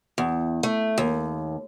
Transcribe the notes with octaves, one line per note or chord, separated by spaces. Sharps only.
E2
A3
D#2